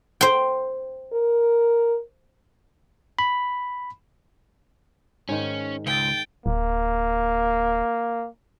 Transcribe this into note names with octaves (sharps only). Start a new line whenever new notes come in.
C5 G5
A#4
B5
G#2 D#3 C#4
C#2 G5 A6
D1 A#3